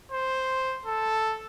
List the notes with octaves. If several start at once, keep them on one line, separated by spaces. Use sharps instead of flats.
C5
A4